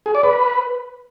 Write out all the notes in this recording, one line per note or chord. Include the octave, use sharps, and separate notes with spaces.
G#4
D5
B4